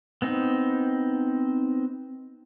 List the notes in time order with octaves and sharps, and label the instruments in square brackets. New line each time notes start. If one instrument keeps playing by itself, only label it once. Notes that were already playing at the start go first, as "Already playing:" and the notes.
[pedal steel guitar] B3 C4 D#4